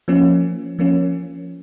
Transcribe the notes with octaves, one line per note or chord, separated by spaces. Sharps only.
F3 A#3 C#4
F3 A#3 C#4